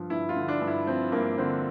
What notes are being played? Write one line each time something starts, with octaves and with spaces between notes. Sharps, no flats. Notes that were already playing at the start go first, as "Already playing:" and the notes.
Already playing: G2 F3
G2 E4
F4
D3
D4
G2
E4
F3 C4
G2 A#3
D3 C4